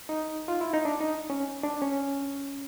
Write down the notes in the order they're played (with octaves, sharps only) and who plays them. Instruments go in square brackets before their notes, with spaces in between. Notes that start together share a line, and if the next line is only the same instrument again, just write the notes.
[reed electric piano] D#4
F4
E4
D#4
D4
D#4
C#4
D4
C#4